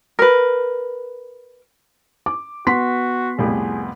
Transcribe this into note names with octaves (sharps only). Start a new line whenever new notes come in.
A#4 B4
D6
B3 F#4 C6 B6
C2 F2 A2 G#4